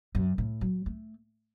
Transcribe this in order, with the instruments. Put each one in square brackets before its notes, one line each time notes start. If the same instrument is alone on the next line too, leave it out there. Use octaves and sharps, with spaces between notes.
[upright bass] F#2
A2
F#3
A3